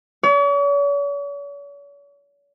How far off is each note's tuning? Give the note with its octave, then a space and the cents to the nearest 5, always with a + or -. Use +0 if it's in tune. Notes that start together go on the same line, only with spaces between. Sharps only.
C#5 +45